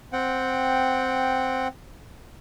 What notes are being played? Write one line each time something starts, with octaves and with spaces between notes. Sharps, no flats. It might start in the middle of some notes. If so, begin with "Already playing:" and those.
C4 F#5 G5